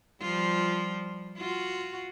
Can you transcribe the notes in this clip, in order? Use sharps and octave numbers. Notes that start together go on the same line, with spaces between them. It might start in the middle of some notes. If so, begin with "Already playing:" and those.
F3 G3 F4
F4 F#4